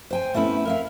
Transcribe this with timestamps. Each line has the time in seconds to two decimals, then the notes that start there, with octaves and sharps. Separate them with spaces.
0.10 C5 G5 G#5
0.34 A3 B3 C#4 E4
0.65 A#4 E5 F5